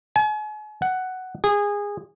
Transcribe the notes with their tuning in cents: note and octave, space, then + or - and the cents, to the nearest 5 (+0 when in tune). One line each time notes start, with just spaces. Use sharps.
G#5 +40
F#5 +5
G#4 -20